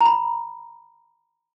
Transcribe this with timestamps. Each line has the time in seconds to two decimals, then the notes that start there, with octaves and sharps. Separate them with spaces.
0.01 A#5
0.05 B5